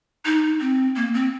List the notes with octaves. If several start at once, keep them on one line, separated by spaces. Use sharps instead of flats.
D#4
C4
A#3
C4